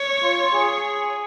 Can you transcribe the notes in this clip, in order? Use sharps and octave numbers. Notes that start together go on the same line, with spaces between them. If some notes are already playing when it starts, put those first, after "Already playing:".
Already playing: C#5
F4
G#4